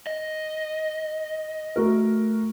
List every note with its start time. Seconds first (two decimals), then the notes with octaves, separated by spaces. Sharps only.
0.07 D#5
1.76 A3 F#4 A#4